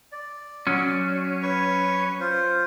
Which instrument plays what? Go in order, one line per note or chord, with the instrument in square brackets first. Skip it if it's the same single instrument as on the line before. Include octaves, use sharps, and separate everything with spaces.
[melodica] D5
[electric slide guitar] F#3 C#4
[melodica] B4 C#5 C#6
F4 C5